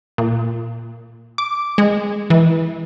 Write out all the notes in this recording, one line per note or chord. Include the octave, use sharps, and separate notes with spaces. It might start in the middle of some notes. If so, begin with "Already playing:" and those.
A#2
D6
G#3
E3